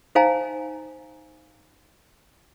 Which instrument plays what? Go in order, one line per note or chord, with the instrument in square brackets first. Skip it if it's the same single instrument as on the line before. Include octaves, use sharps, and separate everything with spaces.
[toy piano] D#4 C5 F5 G#5 A#5